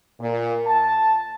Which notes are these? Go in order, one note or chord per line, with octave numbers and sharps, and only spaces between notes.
A#2
A5